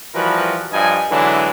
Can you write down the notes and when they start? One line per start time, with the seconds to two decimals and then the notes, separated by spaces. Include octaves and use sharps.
0.14 E3 F3 G3 F#4 A#4 B4
0.72 G2 F3 D#5 G#5
1.10 D3 E3 F#3 G#3 D4 E4